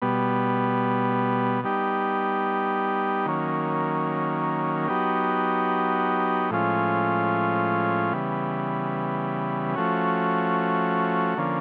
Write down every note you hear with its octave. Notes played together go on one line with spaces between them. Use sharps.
B2 G3 B3
G3 B3 D#4 G4
D#3 F#3 A#3 C#4
F#3 B3 D#4 G4
A2 F3 G#3 C#4 F4
C#3 E3 G3 B3
F3 A3 C#4 F#4
D3 F3 A#3 C#4